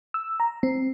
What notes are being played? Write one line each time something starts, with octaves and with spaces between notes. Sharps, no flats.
E6
A#5
C4